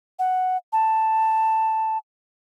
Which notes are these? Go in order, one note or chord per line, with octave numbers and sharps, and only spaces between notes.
F#5
A5